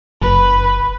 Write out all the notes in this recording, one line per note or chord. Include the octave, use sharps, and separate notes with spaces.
F#1 B4